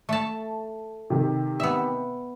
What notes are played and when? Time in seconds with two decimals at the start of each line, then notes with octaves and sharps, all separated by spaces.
0.09 A3 A5
1.10 C3 D#3
1.60 B3 E5